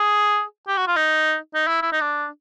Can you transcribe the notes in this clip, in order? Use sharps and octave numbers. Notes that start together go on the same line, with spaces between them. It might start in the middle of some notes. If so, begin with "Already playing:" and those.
Already playing: G#4
G4
F#4
F4
D#4
D#4
E4
E4
D#4
D4